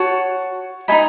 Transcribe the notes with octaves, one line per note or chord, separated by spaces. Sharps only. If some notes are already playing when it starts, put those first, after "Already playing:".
Already playing: F#4 C#5 A5
D#4 A4 D#5 G#5 B5